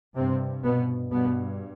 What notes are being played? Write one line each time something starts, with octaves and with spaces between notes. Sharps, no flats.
G2 C3 C4
B2 B3
G2 B2 B3